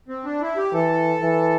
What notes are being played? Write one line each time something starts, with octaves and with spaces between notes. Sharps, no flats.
C4
D4
E4
G4
E3 A4
E3